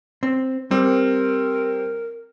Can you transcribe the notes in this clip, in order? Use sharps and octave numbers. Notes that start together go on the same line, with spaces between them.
C4
G3 C4 A#4